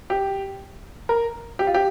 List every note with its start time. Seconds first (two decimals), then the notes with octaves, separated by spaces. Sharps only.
0.10 G4
1.09 A#4
1.59 G4
1.67 F4
1.74 G4